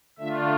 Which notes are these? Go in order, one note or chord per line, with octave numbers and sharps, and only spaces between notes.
D3 A3 D4 F4 E5